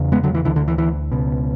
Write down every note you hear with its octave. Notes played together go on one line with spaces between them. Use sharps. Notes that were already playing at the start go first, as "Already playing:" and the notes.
Already playing: E2 C#3
G#3 B3
D3 F#3
E3
D2 D3 E3
D3
E3
E3
C#2 B2